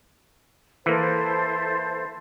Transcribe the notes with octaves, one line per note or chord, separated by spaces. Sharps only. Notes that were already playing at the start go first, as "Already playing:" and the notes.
E3 A#3 E4 A4 C5